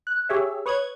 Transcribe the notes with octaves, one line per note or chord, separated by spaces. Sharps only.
F#6
G4 G#4 C#5 E5
B4 C#5 D#6 F#6 G#6